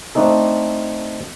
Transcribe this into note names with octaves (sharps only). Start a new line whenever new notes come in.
A3 C4 D4 D#4 A4